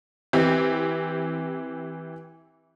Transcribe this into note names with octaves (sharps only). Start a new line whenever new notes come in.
E3 C4 G4